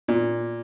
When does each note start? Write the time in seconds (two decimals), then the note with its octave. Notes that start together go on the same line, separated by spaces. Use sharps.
0.08 A#2